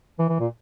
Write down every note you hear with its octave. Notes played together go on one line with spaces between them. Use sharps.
E3
E3
A#2